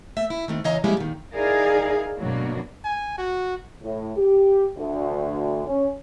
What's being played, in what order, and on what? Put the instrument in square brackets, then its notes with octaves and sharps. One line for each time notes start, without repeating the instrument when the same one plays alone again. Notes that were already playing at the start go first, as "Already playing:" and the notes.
[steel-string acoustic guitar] A3 E5
E4
D#3 A3 C4
C#3 E3 C#5 D#5 F5 A#5
F3 G3 G#3 A#3 C#4 E4
A#2 D#3
[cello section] D#4 E4 G#4 A#4 D5 F5
D2 G2 B2 F#3 A#3 D4
[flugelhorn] G#5
F#4
[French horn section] A2
G4
D2
C#4